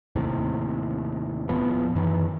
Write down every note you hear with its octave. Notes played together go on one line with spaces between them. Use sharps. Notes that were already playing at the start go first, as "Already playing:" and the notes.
D#2 A2 C3
D#1 A2 F3 B3
F#2 D#3 E3